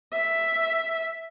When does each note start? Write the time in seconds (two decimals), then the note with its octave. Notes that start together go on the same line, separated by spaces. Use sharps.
0.13 E5